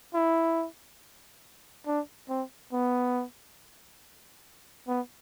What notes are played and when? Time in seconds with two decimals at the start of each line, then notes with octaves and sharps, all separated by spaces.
0.14 E4
1.87 D4
2.29 C4
2.72 B3
4.88 B3